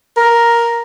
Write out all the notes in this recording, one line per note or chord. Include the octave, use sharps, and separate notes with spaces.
A#4